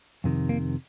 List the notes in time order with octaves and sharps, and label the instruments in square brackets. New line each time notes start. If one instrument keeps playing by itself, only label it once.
[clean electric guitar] F2 C3 D#3
A#3